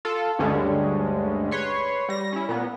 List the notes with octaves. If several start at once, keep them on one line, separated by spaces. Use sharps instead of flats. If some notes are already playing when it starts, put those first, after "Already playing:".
F4 A4
D2 G2 D3 G3 G#3 C#4
B4 C#5 C6
G3 A#6
C#4 E4
A#2 B3